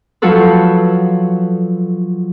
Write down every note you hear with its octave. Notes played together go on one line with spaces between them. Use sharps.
F3 F#3 F4 F#4 A4 B4